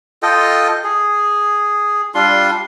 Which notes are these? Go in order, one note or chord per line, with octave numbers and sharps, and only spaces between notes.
F4 A4 D#5 G5
G#4
G3 D4 F4 C6